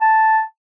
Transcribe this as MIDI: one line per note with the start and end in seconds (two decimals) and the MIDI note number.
0.01 0.41 81